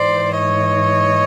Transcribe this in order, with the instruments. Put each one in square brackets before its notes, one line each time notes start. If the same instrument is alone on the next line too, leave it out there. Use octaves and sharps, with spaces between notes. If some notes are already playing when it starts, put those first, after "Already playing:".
Already playing: [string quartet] G#2 E3 C5 D5
C#5 D#5